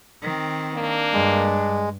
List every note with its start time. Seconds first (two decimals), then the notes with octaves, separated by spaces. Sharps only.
0.22 D#3 C4
0.74 A#3 D4
1.13 G2 G#3